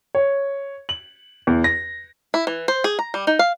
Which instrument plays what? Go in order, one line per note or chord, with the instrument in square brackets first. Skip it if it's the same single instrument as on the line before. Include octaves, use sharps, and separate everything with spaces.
[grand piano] C#5
F#7
E2
A#6
[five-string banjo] E4
E3
C5
G#4
A#5
G3
D#4
F5